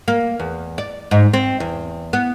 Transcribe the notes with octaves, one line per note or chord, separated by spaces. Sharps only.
A#3
E2
D5
G#2
C4
E2
B3